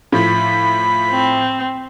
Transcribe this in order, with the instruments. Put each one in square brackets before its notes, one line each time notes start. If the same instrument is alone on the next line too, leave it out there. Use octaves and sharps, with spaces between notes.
[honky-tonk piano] A2 F3 [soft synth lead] B5
[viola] C4